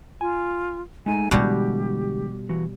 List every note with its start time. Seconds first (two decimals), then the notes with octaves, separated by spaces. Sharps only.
0.21 F4 G#5
1.06 G#3 A3 D#4 G#5
1.31 B2 D3 E3 G3 G#3 G4 A#5
2.49 E3 F#4